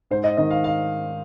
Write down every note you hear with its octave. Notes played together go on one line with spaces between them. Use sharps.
G#2 C5
D#5
D#3 D#5
F5
F5